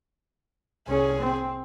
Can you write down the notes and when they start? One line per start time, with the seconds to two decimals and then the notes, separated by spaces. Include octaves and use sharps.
0.88 C2 C#4 G#4
1.21 C4